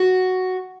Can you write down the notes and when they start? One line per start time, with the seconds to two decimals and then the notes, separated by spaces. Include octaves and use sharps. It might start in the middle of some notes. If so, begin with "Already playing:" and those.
Already playing: F#4